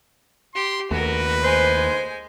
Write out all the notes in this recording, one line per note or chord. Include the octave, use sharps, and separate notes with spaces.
G4 C6
D#2 A3 F#4 A#4 B4
G#3 C5 G#5